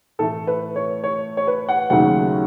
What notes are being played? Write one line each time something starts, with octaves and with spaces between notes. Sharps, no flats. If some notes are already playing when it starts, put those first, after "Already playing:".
A2 E3 A3 A4
B4
C#5
C#5
C#5
B4
F#5
D#2 C#3 F#3 A3 F#5